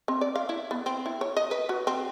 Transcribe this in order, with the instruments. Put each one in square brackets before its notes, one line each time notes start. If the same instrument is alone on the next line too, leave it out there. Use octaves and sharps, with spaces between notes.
[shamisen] C4
D5
F5
E4
B3
C4
E4
C#5
D#5
B4
F#4
C4